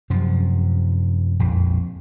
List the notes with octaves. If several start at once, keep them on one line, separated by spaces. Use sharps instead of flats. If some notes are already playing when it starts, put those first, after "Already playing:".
F#2 C3 F3
A#1 F2